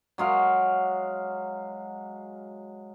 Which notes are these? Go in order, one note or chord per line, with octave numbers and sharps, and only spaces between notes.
F#3 G#3 F5 D6